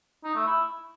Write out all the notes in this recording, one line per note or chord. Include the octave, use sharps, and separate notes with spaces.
D#4
A3
E4